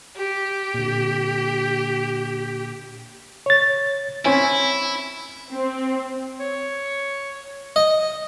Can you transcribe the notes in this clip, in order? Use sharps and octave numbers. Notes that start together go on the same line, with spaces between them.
G4
A#2 D3
C#5 A6
C4 C#4 E4 G#5
C4
C#5
D#5